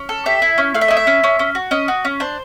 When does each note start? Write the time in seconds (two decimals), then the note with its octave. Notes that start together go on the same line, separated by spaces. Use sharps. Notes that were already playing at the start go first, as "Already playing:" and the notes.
Already playing: C#4
0.09 A4
0.26 G4 E5
0.42 E4
0.58 C#4
0.74 A3 F5
0.81 E5
0.88 E4 D#5
0.97 E5
1.07 C#4
1.24 C#4
1.39 C#4
1.55 F#4
1.71 C#4 D#5
1.88 F#4
2.05 C#4
2.20 D4 C5